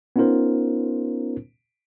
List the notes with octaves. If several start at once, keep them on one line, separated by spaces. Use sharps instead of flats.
B3 C#4 D#4 F4 A#4 C5